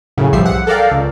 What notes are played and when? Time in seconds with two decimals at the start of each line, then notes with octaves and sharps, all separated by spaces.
0.17 F#2 A2 C#3
0.32 B1 F3 G3 E5 C7
0.45 F#5
0.67 A4 A#4 D5 F5 G5
0.91 C#2